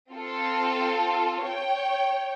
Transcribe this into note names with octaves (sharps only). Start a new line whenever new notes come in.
C4 F4 A4
C#5 G5